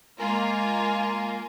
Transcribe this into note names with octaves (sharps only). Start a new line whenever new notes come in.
G#3 A#3 F4 A#4 G#5